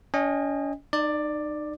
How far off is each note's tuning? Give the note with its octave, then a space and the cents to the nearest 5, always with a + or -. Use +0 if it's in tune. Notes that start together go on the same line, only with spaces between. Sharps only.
C#4 +40 D#5 +0 G#5 -45
D#4 -35 D5 +10